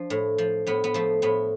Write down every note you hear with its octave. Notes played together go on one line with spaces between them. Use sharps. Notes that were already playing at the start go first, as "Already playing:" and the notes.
Already playing: F3 D4
A2
F3
A2 B3
B3
F3 A3
A2 B3